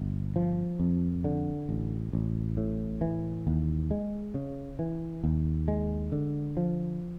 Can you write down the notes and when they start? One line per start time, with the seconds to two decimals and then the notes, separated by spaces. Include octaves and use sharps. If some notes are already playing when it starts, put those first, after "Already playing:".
Already playing: G1
0.36 F3
0.80 F2
1.24 D3
1.69 A1
2.13 A1
2.57 A2
3.01 E3
3.47 D#2
3.91 G#3
4.34 C#3
4.79 E3
5.24 D#2
5.68 G#3
6.12 D3
6.57 F3